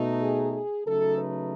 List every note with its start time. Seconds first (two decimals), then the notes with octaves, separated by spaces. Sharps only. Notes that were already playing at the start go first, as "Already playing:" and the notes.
Already playing: B2 A3 D#4
0.21 G#4
0.53 G#4
0.85 C#3 F#3 A3 D#4 A4
1.17 B4